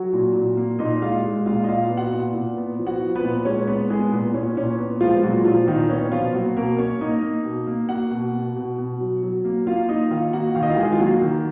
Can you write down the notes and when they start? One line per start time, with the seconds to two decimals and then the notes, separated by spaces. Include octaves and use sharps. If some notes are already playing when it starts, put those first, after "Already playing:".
Already playing: F#3 F#4
0.13 A#2
0.35 A#2
0.57 A#3
0.79 A#2 D#4 D#5
1.02 G#3 F4 F5
1.24 G#3
1.46 A#2 F4 F5
1.64 D#5
1.68 A#2 F4 F5
1.90 B3
1.97 F#4 F#5
2.13 A#2
2.34 A#2
2.57 B3
2.79 F3
2.87 F#4 F#5
3.01 F3
3.15 B3 B4
3.23 A#2
3.45 G#3 C#4 C#5
3.67 B3 B4
3.90 G#3 B3 G#4
4.12 A#2 B3
4.34 A#2 C#4
4.57 A#2 C#4
4.79 B3
5.00 F3 G#3 F4
5.23 A#2 F#3 F#4
5.45 A#2 F3 F4
5.68 A#2 D#3 D#4
5.90 B3 C#4
6.11 B2 F3 F4
6.34 F#3 A#3 F#4
6.57 B2 A#3 A#4
6.78 A#3 C#4 C#5
7.01 A#3 D#4 D#5
7.22 A#3
7.44 B2
7.67 A#3
7.89 A#3 F#4 F#5
8.11 B2
8.33 B2
8.56 B2
8.78 B2
9.00 F#3
9.23 F#3
9.45 A#3
9.66 A#3 F4 F5
9.89 A#3 D#4 D#5
10.11 D#3 F4 F5
10.33 A#3 F#4 F#5
10.55 D#3 F5
10.63 D#5
10.70 F4 F5
10.77 D#3 G#3 G#4
10.92 F4
10.99 F#3 A#3 F#4
11.22 D#3